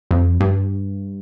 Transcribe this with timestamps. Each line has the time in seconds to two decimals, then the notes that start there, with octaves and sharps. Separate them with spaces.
0.11 F2
0.41 G2